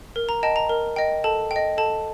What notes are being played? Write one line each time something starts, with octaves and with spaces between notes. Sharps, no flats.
A#4
A#5
D#5 G5 A5
A#5
A#4
D#5 G5
A4 A5
G5
D#5
A4 A5